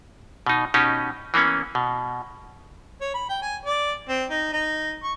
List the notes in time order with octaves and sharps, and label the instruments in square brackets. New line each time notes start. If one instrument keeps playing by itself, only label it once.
[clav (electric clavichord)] B2 D#4
B2 C#4 D#4 G4
E3 A#3 B3 C#4
B2
[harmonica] C#5
B5
G5
G#5
D5
C4
D#4
D#4
C#6